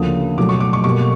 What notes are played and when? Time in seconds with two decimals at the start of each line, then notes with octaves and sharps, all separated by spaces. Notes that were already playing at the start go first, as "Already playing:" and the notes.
Already playing: D2 C#3 F3 A#3 D#6
0.37 B2 F#3 A3 D6
0.49 C#6
0.60 D6
0.73 C#6
0.84 B2 G3 A#3 C#6